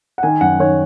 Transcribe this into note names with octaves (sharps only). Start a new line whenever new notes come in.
F#5
D#3 G#5
F#2 F#5
D#3 C#5